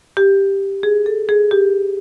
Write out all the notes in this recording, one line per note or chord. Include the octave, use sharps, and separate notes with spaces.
G4
G#4
A4
G#4
G4